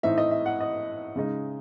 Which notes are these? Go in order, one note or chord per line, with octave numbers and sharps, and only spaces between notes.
A2 E3 C4 D#4 E5
D#5
E5
F#5
D#5
C#3 G#3 D#4